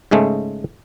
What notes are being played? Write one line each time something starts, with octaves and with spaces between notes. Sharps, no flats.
G#2 C#3 G#3 A3